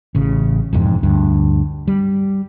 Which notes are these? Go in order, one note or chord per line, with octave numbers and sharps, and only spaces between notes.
A1 C#3
E1 F2 G#2
D2 G2
G3